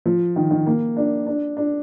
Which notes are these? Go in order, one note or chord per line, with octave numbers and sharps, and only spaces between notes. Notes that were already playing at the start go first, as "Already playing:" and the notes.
F3
D#3
D#3
A#3
D4
D4
D4